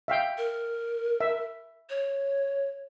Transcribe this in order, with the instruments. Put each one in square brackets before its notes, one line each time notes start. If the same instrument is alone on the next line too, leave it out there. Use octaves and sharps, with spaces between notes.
[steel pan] E5 F5 G5
[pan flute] A#4
[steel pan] E5
[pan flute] C#5